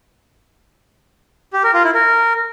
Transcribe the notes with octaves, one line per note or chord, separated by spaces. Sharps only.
G4
A#4
F4
E4
A#4